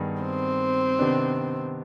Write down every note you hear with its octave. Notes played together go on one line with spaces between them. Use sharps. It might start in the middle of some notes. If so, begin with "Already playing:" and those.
Already playing: G2 D#3 B3 D#4 G#4
C4
C3 D#3 B3 D4